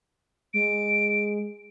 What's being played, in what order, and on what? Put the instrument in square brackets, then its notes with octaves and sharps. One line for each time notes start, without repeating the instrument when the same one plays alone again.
[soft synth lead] G#3 [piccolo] D7